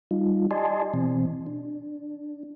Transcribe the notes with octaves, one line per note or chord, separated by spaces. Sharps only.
G3 D#4 F4
G4 D5 D#5 G#5 A5 C6
B2 E3 C4
D4